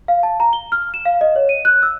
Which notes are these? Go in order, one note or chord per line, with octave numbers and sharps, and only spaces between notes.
F5
A5
A#5
G7
F6
E7
F5
D#5
C#5
D#7
F#6
E6